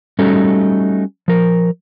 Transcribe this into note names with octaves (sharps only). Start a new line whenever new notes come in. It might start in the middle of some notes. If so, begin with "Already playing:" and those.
G3 A3 C#4 D#4 F#4 A4
F3 A#4